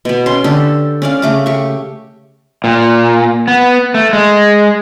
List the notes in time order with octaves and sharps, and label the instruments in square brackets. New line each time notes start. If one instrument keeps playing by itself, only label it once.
[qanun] B2 B3
C#4 C6
D3 G4 A4
C#4 D5 F5
C#3 A3 D6
G4 C#6
[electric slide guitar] A#2
B3
A3
G#3